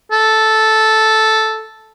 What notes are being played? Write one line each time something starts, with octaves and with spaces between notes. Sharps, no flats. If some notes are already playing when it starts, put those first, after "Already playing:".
A4